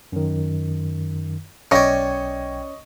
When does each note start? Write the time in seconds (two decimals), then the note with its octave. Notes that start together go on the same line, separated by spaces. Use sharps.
0.12 F#2 D#3
1.71 B1 C#4 D5 D#5 G5 C#6 G#6 A#6